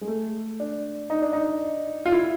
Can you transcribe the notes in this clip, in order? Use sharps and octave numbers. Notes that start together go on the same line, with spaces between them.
G#3
A3
D4
D#4
D4
D#4
F4
E4